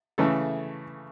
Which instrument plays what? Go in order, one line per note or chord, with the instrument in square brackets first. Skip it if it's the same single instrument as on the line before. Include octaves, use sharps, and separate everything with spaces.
[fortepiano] C#3 E3 A3 A4